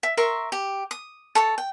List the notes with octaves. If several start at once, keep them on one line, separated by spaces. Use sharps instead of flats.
E5
A#4 E5 C6 C#6
G4
D#6
A4 C#5 A5
G5